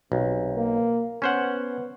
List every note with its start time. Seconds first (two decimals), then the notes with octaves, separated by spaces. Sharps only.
0.12 B1 C3
0.55 A#3
1.22 B3 C#4 C5 F#5